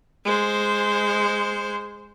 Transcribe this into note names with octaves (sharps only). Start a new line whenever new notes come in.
G#3 C5